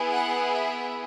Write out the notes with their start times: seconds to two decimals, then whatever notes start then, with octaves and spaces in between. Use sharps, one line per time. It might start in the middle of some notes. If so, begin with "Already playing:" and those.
Already playing: B3 E4 G#4
0.11 F#5
0.54 E5